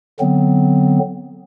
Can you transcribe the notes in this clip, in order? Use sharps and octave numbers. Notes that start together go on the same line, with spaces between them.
D3 F#3 B3 C4